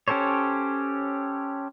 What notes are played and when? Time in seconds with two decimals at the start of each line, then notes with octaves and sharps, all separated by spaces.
0.08 C#4 G4 A4 C5 C#5